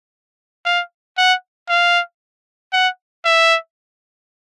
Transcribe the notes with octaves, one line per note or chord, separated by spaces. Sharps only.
F5
F#5
F5
F#5
E5